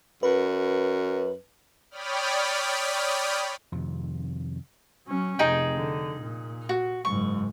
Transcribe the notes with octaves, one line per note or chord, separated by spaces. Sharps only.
F#2 B4
C#5 D5 G5 B5 D#6 F6
F2 C3 D#3
F#3 C#4
F1 D#4 G#4 G5
D3
A#2
F#4
F#1 G#2 C#6